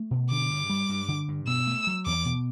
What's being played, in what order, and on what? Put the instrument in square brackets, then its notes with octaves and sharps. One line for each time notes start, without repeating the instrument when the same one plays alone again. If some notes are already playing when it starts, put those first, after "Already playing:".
Already playing: [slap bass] A3
B2
[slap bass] D3 [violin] D6
[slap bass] G2
G3
G2
D3
G2
[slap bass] B2 [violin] E6
[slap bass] A3
F#3
[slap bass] E2 [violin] D6
[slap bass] B2